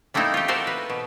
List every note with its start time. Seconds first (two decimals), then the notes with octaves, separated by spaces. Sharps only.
0.14 G3 A3 A#3 C4 D#4 E4
0.34 F4 G4
0.48 F#4 A4 A#4 C5
0.67 B4
0.90 B2